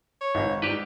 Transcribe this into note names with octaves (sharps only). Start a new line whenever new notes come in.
C#5
G#1 C#2
G#2 G4 B4 D5